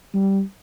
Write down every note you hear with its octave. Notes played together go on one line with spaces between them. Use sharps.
G3